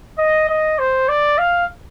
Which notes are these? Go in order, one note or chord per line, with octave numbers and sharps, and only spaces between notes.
D#5
D#5
C5
D5
F5